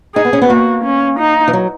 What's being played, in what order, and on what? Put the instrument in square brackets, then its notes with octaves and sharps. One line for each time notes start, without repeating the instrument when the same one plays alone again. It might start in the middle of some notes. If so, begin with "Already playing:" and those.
[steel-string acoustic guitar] D#4 [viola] G#4
[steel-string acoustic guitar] B3
C#4
B3
[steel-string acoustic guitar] A#3 [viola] F#4
[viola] C#4
D#4
[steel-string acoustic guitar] E3
F#3